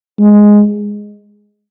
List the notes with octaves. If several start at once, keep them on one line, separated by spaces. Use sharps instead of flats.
G#3